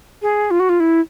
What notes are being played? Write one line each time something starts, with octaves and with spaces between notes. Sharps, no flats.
G#4
F4
F#4
F4
E4